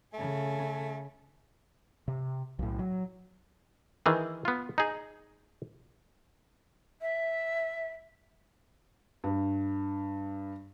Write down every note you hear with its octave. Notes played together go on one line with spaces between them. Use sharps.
C#3 A3 G#5
C3
B1 A2
F#3
D#3 E3 G#4
B3 F4
D#4 G#4
E5
G2